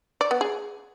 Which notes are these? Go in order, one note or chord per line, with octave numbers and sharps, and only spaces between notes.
D5
B3
G#4